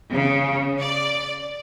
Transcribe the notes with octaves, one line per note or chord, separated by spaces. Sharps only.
C#3
D5